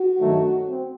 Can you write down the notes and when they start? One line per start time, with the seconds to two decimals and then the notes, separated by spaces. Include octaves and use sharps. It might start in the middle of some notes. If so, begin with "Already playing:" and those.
Already playing: F#4
0.19 G2 D#3 F#3 A3 D#4
0.67 C4